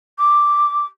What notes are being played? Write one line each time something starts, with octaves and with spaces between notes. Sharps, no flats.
D6